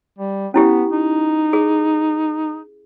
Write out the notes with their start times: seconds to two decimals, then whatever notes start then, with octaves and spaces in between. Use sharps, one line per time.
0.19 G3
0.54 B3 C#4 E4 G4
0.92 D#4
1.53 G#4